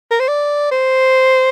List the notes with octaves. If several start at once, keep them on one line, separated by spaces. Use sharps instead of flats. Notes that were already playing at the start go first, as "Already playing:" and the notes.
A#4
C5
D5
C5